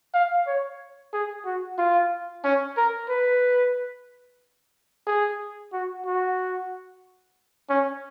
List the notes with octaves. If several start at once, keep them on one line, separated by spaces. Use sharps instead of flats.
F5
C#5
G#4
F#4
F4
C#4
A#4
B4
G#4
F#4
F#4
C#4